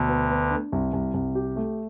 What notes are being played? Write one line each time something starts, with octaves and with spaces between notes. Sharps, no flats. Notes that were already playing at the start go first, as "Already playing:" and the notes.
Already playing: D2 B2 D3
B3
B3
D4
C2
C2
C2
G4
A3